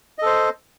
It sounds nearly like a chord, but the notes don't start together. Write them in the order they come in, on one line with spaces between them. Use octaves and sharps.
D#5 A4 C5